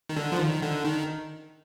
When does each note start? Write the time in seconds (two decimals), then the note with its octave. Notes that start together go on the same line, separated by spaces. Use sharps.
0.09 D#3
0.16 D3
0.32 F3
0.39 D#3
0.62 D3
0.85 D#3